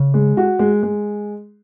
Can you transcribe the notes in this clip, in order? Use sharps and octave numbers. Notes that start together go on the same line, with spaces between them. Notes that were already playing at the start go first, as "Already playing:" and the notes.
Already playing: C#3
G#3
F#4
G#3
G#3